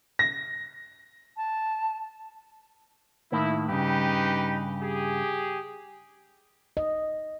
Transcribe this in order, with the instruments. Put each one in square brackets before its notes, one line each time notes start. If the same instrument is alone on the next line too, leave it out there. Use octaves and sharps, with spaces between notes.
[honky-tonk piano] A#6
[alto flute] A5
[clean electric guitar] A2 D#3 A#3 [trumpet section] E4
[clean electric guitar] G2 C#3 [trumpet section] D#4 G4 B4
[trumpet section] G4 G#4
[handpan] D#5